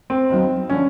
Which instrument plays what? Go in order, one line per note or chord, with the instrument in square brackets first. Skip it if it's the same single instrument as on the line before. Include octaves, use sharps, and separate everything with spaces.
[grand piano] C4
[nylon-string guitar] D#2 D#3 F#3 B3 D#4
[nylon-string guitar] D3 F3 A#3 D4 [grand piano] C#4